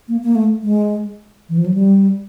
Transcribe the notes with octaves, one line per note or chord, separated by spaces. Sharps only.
A#3
A#3
A3
G#3
E3
F3
F#3
G3